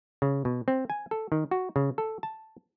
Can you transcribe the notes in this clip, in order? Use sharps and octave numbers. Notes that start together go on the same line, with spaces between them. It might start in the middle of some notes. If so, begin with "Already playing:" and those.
C#3
B2
C4
G#5
A4
D#3
F#4
C#3
A4
A5